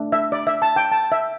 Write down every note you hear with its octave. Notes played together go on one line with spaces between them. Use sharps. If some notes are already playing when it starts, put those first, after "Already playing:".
Already playing: A3 D4
E5
D5
E5
A5
G5
A5
E5